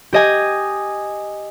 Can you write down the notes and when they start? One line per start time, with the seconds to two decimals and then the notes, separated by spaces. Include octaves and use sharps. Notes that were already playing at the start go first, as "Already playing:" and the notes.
0.13 G4 D#5 G#5